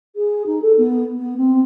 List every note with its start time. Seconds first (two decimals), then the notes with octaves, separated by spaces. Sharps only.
0.15 G#4
0.46 D#4
0.61 A4
0.77 B3
1.18 B3
1.36 C4